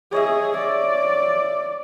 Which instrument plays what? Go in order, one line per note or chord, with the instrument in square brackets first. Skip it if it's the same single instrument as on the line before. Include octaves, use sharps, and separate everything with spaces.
[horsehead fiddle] G#4 [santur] C#5 D#5 E5
[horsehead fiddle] D5